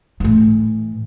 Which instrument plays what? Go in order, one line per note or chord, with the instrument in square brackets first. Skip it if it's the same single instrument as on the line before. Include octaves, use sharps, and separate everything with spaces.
[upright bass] A2 E3